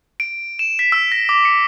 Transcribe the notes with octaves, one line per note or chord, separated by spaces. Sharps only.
D7
E7
B6
E6
A#6
D6
C#7